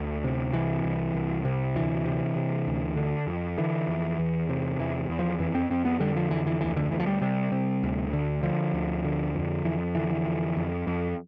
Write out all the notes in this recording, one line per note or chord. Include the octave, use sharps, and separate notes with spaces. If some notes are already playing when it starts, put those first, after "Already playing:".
Already playing: D2
C3
C2 E3
C2
C2
C3
D2 E3
C3
C3
D2
D3
F2
D3 E3
F2
E2
C3
E2 E3
E2
F3
F2 E3
C4
F2 C4
B3
D3 G3
F3
F2 E3
E3
D2 E3
D3
D2 E3
F3
G3
C3 G3
C3
D2
D3
D3 F3
D2
D3
F2
F2 E3
D3 E3
E3
F2
F2
F2